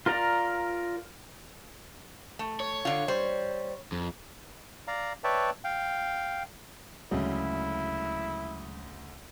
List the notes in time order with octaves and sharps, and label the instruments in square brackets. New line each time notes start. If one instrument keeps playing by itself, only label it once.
[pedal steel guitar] F4 A#4 D5 A#5
[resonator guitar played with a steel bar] A3
[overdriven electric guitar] C#5
[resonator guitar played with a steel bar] D3 F4
G3 C5
[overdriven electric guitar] F2
[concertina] D5 F5 A#5
B4 C#5 D5 E5 G5 A5
F5 G5
[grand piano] D2 C#3 [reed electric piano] F#3 G#3 [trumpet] E4